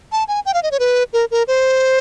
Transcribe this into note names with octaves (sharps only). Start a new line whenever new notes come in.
A5
G#5
G5
F5
D#5
C#5
B4
A#4
A#4
C5